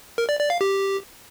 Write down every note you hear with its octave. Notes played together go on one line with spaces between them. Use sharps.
A#4
D5
D5
F5
G4